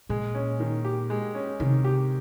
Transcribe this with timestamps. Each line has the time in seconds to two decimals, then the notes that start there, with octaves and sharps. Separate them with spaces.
0.09 A#2 G#3
0.35 C#4
0.60 D#3
0.85 G4
1.10 G#3
1.35 C#4
1.60 C3 D#3
1.84 G4